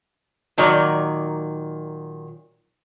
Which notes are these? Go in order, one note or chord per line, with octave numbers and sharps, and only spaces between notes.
A#2 D#3 F#3 D5 A#5